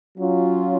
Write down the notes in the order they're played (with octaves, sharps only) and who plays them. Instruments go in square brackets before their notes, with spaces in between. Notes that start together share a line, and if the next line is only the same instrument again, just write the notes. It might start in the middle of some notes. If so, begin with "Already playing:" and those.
[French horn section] F#3 C#4 F4